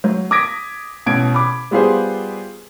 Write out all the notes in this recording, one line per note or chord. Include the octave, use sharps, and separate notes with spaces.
F#3
D6 D#6 G#6 A#6 B6 D7
A1 B2 G#6 D7
B5 D6
G3 B3 F4 G4 G#4 C5